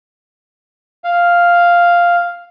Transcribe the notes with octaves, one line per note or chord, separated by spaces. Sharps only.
F5